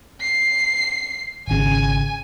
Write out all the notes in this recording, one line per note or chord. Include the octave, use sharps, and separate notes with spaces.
C7
G#1 C#3 G#5